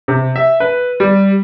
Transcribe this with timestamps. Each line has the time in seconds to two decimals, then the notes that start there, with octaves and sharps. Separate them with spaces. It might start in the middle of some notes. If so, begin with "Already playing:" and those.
0.08 C3
0.36 E5
0.60 B4
1.00 G3